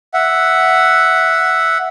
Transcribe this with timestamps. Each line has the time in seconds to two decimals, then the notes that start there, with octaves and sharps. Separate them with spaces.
0.14 E5 F#5